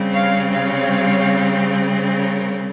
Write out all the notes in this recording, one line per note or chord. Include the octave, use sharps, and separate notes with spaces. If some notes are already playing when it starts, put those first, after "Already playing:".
Already playing: C#3 G3 C4
C#5 F5
C#5 F5
A#4 C#5